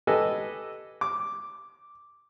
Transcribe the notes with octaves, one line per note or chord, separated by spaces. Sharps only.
G4 A4 B4 D#5 G#5
D6